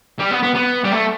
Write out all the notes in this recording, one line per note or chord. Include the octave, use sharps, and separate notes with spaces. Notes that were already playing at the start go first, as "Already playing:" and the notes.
G3
B3
B3
B3
G3
A3